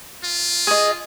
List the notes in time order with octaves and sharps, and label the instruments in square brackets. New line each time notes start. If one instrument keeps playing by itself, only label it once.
[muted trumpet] F4
[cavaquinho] G#4 D#5